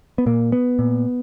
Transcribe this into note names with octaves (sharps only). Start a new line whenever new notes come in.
B3
A#2 A#3
B3
A#2